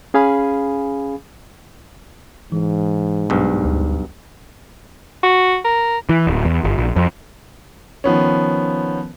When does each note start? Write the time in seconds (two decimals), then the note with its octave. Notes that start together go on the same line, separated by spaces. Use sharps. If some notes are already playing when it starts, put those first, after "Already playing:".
0.14 C#4 G#4 F5 G#5 B5
2.52 G#2 E3
3.30 B1 G2
3.65 D2
5.23 F#4
5.65 A#4
6.09 E3
6.27 D1
6.45 E2
6.64 G1
6.78 A#1
6.96 F2
8.04 D#3 F3 B3 C#4